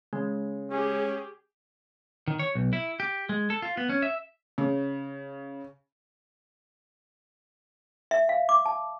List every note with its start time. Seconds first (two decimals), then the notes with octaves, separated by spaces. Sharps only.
0.13 C#3 G#3
0.71 C#4 G4 G#4
2.28 D#3
2.39 C#5
2.55 B1
2.73 E4
3.00 G4
3.29 G#3
3.50 A4
3.62 F4
3.77 B3
3.90 C#4
4.02 E5
4.58 C#3
8.11 E5
8.29 F5
8.49 D6
8.66 A5